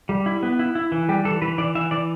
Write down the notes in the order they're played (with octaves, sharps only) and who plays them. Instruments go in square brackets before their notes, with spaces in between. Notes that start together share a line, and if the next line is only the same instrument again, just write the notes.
[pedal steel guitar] G3
E4
B3
E4
E4
E3
G3 G4
E3 A4
E3 B4
E3 D5
E3 E5
E3 D5